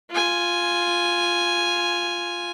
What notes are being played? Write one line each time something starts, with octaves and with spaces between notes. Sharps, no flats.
F4 G#5